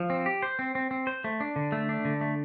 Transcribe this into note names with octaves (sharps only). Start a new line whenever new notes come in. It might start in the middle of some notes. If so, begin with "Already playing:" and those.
Already playing: F3
C4
G4
C5
C4
C4
C4
C5
A3
D4
D3
A3
D4
D3
A3